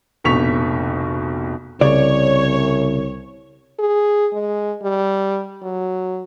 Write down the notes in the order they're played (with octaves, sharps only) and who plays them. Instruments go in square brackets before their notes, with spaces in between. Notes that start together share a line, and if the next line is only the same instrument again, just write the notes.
[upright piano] F1 A#1 B2 C#6 B6 F7
[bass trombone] C2 [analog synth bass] C#3 [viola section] C#5 [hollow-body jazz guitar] D5
[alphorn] G#4
G#3
G3
F#3